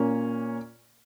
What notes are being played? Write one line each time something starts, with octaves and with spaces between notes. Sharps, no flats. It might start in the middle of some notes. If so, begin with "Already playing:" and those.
Already playing: A#2 A#3 C#4